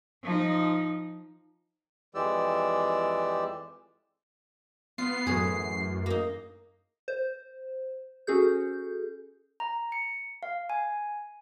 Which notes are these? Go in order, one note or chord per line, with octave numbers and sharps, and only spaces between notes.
F3 D#4
F2 E3 G#3 G4 D5 E6
B3 F4 C7
F#2 A2 E3 G#4
A#3 D#4
C5
C#4 F#4 G#4 A4 G6
A#5
C#7
F5
G#5